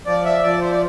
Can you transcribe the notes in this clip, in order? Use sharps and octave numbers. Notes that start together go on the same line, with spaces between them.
F3 D5
E5
F3 D5
C5
D5